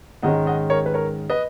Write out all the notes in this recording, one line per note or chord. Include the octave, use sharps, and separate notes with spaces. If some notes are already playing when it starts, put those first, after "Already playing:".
G#2 D#3 G#3 C#4 D#5 F#5
D#5 F#5
A#4 C#5
B4
A#4 C#5
B4 D#5